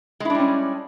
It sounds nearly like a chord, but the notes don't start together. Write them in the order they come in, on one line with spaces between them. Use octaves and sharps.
G#3 E4 D4 G3 C#4